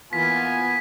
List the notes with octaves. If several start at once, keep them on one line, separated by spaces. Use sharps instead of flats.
E3 A#3 B3 F4 G#5 B6